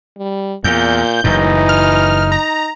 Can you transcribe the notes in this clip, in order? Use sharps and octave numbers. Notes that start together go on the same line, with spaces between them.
G3
E2 A#2 G6
F#1 F#2 A2 E3 D#4
F6
A#5